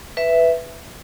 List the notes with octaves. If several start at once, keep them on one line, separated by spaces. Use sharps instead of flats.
B4 E5